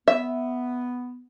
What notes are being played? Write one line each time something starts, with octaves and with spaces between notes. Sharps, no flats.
B3 E5